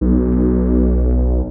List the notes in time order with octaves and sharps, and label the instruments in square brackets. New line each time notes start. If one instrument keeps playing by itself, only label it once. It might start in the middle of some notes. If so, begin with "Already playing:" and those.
[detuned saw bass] B1